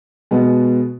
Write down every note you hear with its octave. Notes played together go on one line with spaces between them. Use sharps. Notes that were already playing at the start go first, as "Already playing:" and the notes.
B2 G#3 B3